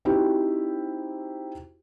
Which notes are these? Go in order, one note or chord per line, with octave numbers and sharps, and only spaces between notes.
C4 D#4 E4 F#4 G4